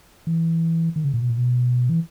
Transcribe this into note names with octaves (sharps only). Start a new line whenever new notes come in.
E3
D#3
C#3
A#2
B2
A#2
B2
E3